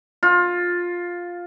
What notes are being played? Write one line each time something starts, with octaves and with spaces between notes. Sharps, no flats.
F4